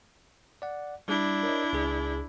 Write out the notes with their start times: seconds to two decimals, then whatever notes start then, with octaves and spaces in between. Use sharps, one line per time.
0.62 D5 F#5
1.08 G3 D4 E4
1.43 A#4 C#5 D#5
1.73 C#2 G#4